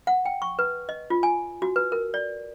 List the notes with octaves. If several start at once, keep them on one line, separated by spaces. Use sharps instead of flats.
F#5
G5
C#6
B4
D#5
F4
G#5
F#4
B4
A#4
D5